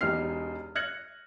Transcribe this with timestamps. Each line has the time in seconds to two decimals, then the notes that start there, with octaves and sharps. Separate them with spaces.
0.01 E1 E2 D#4 G4 F6 C7
0.75 F6 F#6 G#6 A#6 C#7 F#7